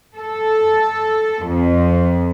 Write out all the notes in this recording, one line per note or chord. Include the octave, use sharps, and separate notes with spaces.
A4
F2